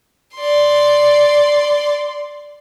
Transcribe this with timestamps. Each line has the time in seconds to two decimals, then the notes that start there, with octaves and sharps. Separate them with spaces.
0.36 D5 C6